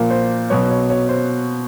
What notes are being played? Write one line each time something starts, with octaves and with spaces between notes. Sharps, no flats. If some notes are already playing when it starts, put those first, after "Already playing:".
Already playing: A#2 F3 A#3 A#4
C5
B2 F#3 B3 C#5
C#5
C#5
C5